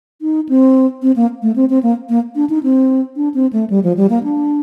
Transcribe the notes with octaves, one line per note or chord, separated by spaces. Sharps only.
D#4
C4
C4
A#3
A3
C4
C4
A#3
A#3
D4
D#4
C4
D4
C4
A3
G3
F3
G3
A#3
D4